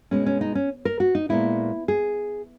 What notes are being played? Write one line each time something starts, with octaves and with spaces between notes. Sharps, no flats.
B2 G#3 B3 C#4
C#4
D#4
C#4
A#4
F#4
D#4
A#2 G#3 B3 E4
G#4